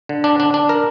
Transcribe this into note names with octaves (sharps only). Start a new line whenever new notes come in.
D3
D4
D4
D4
A#4